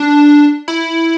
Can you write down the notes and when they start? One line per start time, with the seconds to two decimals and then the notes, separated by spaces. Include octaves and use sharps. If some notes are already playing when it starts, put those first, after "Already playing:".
Already playing: D4
0.68 E4